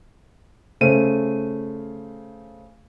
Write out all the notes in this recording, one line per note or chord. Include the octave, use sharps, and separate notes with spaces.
C#3 A3 C5 D#7